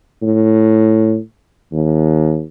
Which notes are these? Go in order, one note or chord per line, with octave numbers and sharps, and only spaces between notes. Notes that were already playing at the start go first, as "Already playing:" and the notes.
A2
D#2